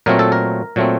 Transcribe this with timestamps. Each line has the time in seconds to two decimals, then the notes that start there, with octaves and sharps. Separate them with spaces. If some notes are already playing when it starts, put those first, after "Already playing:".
0.06 A#2 F#3 A3 C4 A#4
0.19 A4
0.32 A#4
0.76 A#2 F#3 A3 C4